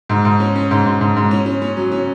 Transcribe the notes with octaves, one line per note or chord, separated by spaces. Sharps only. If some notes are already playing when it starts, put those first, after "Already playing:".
G#2
G#2
C#4
C#4
G#2
G#2
G#2
G#2
C#4
C#4
C#4
F#3
C#4